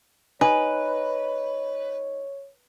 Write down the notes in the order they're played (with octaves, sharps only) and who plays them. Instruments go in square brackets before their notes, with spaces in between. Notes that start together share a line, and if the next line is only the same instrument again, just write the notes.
[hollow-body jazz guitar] D#4 [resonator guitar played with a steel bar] B4 [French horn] C#5 [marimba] G#5